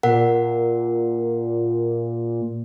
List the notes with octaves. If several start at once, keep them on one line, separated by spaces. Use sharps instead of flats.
A#2 A#4 F#5